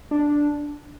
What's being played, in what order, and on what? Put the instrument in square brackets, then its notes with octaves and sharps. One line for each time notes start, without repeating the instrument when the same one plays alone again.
[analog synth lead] D4